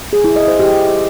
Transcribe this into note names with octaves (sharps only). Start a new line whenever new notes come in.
G#4
E4
D#5
C5
G4